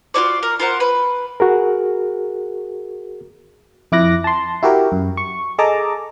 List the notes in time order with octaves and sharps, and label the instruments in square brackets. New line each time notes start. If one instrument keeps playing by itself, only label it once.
[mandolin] F4 F#4 C#5 D5
A#4
F4 A#4 C5 F#5
B4
[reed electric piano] F#4 G#4 A#4
[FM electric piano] F2 E4 D6 F#6 A#6
A5 C6
E4 F#4 G4 A#4
F#2
C#6
G#4 A4 D#5 A5 A#5 D6